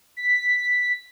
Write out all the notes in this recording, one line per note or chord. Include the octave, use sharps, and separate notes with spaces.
B6